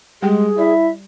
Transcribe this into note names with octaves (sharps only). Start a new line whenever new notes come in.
G3 G#3 G4 G#4 G5
E4 D5 E5